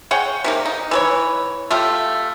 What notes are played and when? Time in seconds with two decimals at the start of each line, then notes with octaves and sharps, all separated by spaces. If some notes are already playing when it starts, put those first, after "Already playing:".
0.11 G#4 C#5 F#5 G5
0.44 C3 D#3 A#3
0.65 D#4
0.91 E3 B4 C#5
1.71 A3 F4 G4